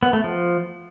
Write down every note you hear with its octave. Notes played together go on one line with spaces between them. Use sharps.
B3
A3
F3